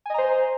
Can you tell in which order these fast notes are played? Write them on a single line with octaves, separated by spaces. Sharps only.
G#5 D#5 A#5 C5